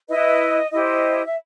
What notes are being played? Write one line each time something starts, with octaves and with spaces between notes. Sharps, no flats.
E4 B4 D#5
E4 G4 C5 D#5
E5